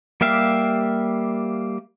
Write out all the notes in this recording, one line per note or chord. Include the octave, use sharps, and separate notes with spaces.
G3 A#3 G4 E5 F5